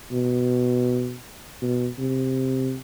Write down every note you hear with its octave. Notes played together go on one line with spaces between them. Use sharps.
B2
B2
C3